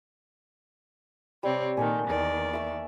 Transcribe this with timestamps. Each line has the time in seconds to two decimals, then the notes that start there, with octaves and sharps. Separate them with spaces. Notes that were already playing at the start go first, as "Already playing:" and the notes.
1.43 C3 G3 C4 C#5
1.77 A#2 D#3 A#3 A4 G#5
2.08 E2 D#3 D5
2.53 E5 C#6 D6